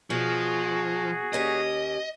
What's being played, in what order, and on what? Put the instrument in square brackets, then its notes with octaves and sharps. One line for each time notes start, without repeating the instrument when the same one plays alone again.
[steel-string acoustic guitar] B2 [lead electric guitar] F3 [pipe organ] F#4 G#4
[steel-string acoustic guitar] D#2 C#4 G4 [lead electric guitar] D#5